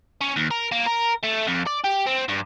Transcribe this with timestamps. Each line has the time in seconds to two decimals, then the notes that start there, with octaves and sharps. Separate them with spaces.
0.21 C#4
0.36 D#2
0.51 A#4
0.72 A#3
0.86 A#4
1.23 A3
1.47 F2
1.66 D5
1.84 G4
2.07 C4
2.29 G2